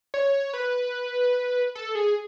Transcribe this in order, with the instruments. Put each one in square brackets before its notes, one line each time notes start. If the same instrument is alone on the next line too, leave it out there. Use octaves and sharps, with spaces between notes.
[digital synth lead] C#5
B4
A4
G#4